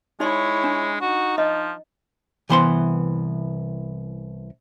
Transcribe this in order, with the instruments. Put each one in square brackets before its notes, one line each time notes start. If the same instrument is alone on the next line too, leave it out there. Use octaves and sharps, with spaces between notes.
[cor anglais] G#3 [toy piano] D#4 D5 C6 [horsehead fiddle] E4 C#5
[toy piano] D4
[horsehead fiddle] D#4 [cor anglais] F#4
[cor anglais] F3 [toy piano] D#5
[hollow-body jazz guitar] C2 E3 B3 C5 F#5 C6